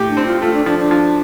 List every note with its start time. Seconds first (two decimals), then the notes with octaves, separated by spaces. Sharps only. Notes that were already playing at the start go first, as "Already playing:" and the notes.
Already playing: A2 G4
0.09 D4
0.17 C4
0.26 F4
0.42 A3 F4
0.53 D4
0.66 F3 D4
0.78 D4
0.91 F3